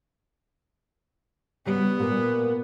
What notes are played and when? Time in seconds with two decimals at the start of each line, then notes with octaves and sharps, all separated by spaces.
1.66 C#3 G3 B3
2.00 A#2 A#3